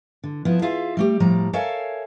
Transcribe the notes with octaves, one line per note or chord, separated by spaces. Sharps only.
D3
F3 B3 E4
F4 G#4 E5 F5
G3 A3 G4
A2 F3 G3 A#5
A4 A#4 C#5 E5 F5 G#5